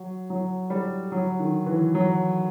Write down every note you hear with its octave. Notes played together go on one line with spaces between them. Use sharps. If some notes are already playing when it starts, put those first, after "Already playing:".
Already playing: F#3
F#3
G3
F#3
D#3
E3
F#3